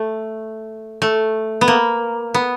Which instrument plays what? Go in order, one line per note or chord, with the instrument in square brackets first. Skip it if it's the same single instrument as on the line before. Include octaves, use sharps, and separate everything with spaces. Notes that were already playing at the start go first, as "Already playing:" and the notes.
Already playing: [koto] A3
A3
B3
A#3
B3